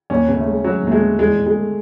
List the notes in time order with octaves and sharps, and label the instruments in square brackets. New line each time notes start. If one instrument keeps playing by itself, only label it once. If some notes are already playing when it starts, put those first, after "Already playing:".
[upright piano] D#2 [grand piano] C#4
[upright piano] C#3
[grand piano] A3
[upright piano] G#3
[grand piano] F#3 [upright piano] C#4
[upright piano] D#2 [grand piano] A3
[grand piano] G#3
[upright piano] C#3
[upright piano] E2 [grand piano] G#3
[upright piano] B2
[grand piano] G#3
[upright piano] A3